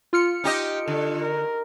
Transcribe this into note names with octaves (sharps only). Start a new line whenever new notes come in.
F4 F6 C#7
D#4 G4 D#5
D3 A4
A#4